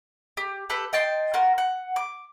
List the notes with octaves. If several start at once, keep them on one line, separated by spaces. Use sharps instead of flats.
G4
G4 A4 B4
D#5 G5 A5 C6
F4 F#4 A#4
F#5
D6